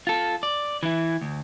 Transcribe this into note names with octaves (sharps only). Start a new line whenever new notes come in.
F4 A4
D5
E3 E4
D2